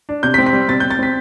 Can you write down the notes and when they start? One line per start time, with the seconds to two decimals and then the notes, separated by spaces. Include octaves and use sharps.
0.09 D4
0.23 C3 G6
0.34 B6
0.38 C4
0.46 B6
0.53 G3
0.69 C3 A6
0.80 C3 G6
0.91 A6
0.99 C4 B6